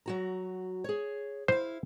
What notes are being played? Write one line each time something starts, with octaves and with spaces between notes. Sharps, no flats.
F#3 F#4 A#5
G#4 C#5
E4 C5 F5